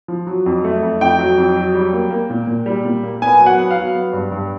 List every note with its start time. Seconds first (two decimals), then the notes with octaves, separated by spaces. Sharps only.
0.08 F3
0.27 F#3
0.46 F2
0.64 A3
0.83 F2
1.01 F2 G5
1.19 F#3
1.38 F2
1.57 F#3
1.74 G3
1.93 A#3
2.11 A#3
2.30 A#2
2.47 A#2
2.66 G3
2.85 A#2
3.03 A#3
3.22 B3 G#5
3.39 F#3
3.46 F#5
3.58 B3
3.71 F5
3.76 F#3
3.95 B3
4.13 G2
4.32 G2